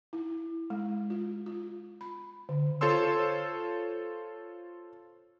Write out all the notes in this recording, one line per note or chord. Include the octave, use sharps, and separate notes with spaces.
E4
G#3
F4
F4
B5
D3
F4 A4 C5 C#5 C6 E6